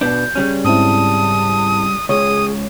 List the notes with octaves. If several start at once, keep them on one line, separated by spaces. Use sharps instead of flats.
B2 B3 D4 G6
C#3 G3 C#4
G#2 C4 E4 A5 D#6
C#2 G#4 C#5 D#6